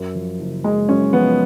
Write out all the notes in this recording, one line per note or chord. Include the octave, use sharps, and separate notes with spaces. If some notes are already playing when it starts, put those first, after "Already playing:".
Already playing: F#2
F3
F#1
F#1 G#3
F#2 C#4
F3 B3